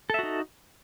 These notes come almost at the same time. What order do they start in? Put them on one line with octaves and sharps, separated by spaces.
A4 E5 F#4 D#4